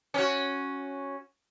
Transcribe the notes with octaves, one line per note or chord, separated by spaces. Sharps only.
C#4 F#4